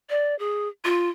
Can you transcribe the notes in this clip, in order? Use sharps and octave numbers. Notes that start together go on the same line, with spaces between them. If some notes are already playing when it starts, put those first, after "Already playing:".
D5
G#4
F4